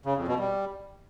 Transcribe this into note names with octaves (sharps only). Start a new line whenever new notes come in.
C#3
F2
B2
G3